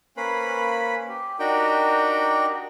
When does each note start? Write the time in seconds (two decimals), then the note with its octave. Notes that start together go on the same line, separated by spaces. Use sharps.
0.17 A#3 C#4 B4 C5 B5
1.09 G4
1.39 D4 D#4 F#4 G4 A#4 G5